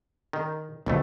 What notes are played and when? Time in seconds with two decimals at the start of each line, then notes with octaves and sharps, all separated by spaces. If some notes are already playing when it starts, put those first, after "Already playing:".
0.33 D#3
0.86 B1 F2 D3 A3